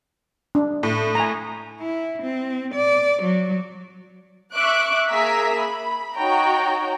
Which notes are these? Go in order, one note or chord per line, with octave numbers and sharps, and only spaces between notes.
D4
A2
G#5 A#5
E4
C4
D5
F#3
E5 C#6 D6 F#6 D7
A#3 G#4 E5 A#5 E6 B6
B5
D#4 F#4 C#5 G5 A#5